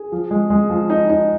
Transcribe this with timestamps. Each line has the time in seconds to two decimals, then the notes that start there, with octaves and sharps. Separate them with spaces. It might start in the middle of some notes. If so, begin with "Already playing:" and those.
Already playing: G#4
0.12 F3
0.31 G#3
0.50 G#3
0.70 F3
0.90 D#4
1.10 D#4